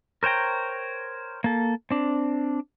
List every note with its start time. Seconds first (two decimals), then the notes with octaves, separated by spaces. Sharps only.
0.23 A#4 C5 C#5 G5 A#5
1.44 A#3 A4
1.91 C4 D4